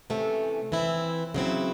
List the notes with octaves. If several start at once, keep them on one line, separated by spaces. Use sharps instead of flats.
C3 E3 A3 C#4
E3 C4 E4
C#3 F#3 C4 E4